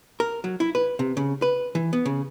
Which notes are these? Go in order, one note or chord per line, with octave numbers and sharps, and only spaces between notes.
A#4
F#3
E4
B4
C3
C#3
B4
E3
B3
C#3